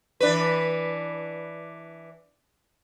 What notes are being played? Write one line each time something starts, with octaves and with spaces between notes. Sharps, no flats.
E3 D4 B4